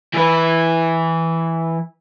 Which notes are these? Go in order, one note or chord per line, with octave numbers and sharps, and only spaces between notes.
E3 B4